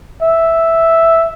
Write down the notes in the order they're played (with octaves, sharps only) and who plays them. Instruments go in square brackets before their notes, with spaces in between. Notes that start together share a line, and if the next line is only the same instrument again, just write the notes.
[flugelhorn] E5